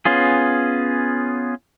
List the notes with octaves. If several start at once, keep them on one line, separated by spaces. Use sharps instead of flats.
B3 C#4 F4 G#4